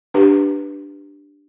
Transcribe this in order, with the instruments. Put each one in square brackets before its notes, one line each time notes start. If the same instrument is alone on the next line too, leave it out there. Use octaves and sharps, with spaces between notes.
[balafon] D4 G4 B4